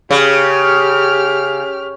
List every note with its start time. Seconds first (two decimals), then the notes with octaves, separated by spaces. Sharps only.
0.11 C#3 G4 F6